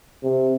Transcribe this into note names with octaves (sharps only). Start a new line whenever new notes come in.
C3